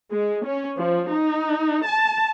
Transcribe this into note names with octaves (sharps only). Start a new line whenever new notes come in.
G#3
C#4
F3
D#4
A5